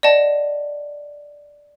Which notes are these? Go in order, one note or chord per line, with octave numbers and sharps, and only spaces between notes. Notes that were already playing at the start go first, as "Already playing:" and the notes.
D5 D#5 F#5 A5